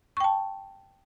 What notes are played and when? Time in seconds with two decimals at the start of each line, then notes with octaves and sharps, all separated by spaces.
0.17 C#6
0.20 G5
0.24 A5